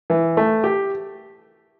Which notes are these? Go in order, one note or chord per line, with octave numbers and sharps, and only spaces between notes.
E3
A3
G4